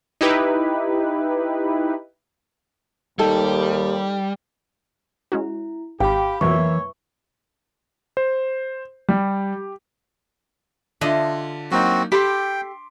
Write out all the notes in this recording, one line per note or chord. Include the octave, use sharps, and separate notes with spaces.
D#4 E4 G4 B4
D#2 G3 D#4 A4
G#3 C#4 E4 F#4
G#1 G4 F5 G5 B5
F2 B2 E3 F#3 A#3 C#5 E5 C#6
C5
G3 G4
D3 D4 F4 D#5 E5
F#3 A#3 C4 D#4 F#4
G4 A4 G5 B5 C6 D6 B6